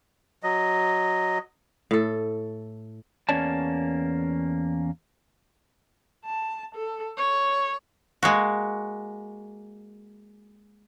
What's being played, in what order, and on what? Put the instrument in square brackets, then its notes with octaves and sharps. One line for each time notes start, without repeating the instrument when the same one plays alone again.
[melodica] F#3 D#5
[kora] A2 A4
[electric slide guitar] E2 A#3 C#4 C#5 D5 A5
[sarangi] A5
A4
C#5
[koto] G#3 A#3 F#4